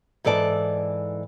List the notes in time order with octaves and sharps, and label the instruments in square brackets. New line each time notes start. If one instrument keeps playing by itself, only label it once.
[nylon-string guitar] G#2 E3 A4 D5 A5